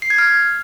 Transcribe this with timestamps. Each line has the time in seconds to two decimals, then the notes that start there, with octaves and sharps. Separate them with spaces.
0.02 C7
0.10 G#6
0.18 F6